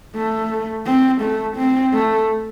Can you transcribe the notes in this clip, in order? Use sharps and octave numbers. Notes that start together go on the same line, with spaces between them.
A3
C4
A3
C4
A3